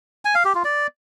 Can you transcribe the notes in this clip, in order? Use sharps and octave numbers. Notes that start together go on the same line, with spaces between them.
G#5
F5
G4
F4
D5